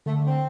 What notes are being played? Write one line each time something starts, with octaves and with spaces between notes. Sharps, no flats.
D3 A3
C4